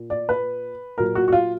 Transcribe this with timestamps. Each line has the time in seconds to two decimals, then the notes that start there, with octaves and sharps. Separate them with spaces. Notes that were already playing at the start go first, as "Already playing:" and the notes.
Already playing: A#2
0.10 D5
0.29 B4
0.98 A#2 F#3 A#4
1.15 F#4
1.28 F#4
1.32 F4